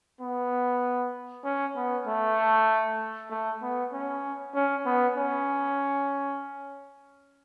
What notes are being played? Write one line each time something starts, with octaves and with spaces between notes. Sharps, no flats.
B3
C#4
B3
A3
A3
B3
C#4
C#4
B3
C#4